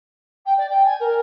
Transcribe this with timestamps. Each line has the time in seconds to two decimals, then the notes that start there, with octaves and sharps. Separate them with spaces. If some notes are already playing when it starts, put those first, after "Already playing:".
0.45 G5
0.58 D5
0.70 G5
0.85 G#5
1.00 A#4